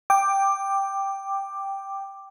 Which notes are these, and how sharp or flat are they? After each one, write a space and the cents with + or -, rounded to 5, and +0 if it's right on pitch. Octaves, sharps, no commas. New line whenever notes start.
G5 +0 D6 +10